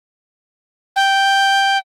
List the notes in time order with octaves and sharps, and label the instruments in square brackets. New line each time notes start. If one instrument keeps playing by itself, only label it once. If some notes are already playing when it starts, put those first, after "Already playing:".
[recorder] G5